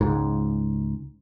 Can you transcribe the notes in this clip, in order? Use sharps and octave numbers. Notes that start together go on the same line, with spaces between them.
C#2 G#2